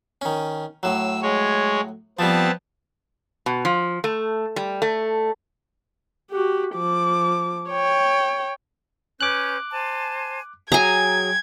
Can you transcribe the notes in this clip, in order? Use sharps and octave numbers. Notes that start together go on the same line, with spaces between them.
D#3 C#4
A2 F#3 E6
G#3 C#5
F3 G3 B3 C4 A5
B2
F3
A3
G3
A3
F#4 G4
F3 D6
C#5 G5
C#4 B4 D6 F#6 G6
C5 G#5 A5
F#3 G#4 G5 G#5 A#5 G#6